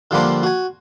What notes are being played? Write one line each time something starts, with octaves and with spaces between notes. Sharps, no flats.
D3 F3 G3 A#3 D4 C5
F#4 G#5